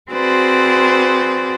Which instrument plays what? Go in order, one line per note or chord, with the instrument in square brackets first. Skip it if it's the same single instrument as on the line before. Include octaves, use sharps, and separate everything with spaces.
[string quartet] C4 F#4 G#4 B4 C5 D5